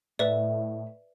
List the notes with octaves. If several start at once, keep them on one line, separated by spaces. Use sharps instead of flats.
A2 B4 D5 E5